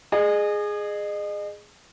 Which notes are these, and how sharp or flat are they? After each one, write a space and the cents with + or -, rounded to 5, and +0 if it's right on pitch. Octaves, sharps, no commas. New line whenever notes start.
G#4 +0 D#5 -35